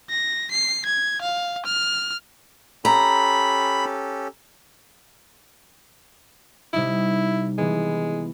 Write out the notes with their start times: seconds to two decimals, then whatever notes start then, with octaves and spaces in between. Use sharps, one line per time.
0.10 A#6
0.51 C7
0.86 G#6
1.22 F5
1.65 F6
2.85 C#4 G4 A4 A#5 B5
6.74 C3 G3 D#4 E4
7.58 E3 G#3 B3